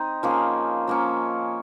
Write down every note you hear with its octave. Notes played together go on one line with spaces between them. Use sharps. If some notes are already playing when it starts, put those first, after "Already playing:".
Already playing: C4 D#4
F3 A#3 C#4 G#4
F3 A#3 C#4